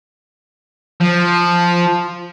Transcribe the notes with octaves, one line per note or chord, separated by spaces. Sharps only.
F3